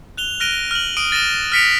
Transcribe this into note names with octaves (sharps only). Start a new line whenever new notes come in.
F#6 F7 G7
F6 F#6 A#6 D7 D#7 G7
F6 F#7
D#6 D7 D#7
A6 A#6 D#7 E7 G7
F6 A#6 B6 C#7 D7 F7